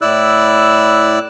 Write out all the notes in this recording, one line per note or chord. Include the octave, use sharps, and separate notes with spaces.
A2 E4 D5 E6 F#6